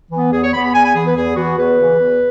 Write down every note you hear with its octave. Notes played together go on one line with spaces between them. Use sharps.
E3 B3
E2 G#4
C#5
E3 B3 B5
B5
E2 G#5
G#5
E3 B3 G#4
B4
E2 G#4
E3 B3 F#4
E2 B4
C#3 E3
E2